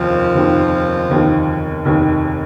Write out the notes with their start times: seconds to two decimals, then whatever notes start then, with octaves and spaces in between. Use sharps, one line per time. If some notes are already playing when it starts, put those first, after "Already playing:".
Already playing: F1 D#2 D#3 F3
0.34 F1 D#2 D#3
1.09 F1 D#2 D#3
1.85 F1 D#2 D#3